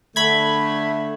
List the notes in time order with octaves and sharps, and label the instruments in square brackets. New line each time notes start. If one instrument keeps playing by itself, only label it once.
[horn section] D3 A3 [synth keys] B5 G#6